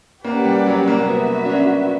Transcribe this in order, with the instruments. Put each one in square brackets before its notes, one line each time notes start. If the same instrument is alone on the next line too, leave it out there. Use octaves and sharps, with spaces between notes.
[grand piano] A#3 [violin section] C#4 G4 B4 D5 F#5
[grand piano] G3
F#3
A#3
A#3
[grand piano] B3 [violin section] F#4 B4 E5
[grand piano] D4
C#4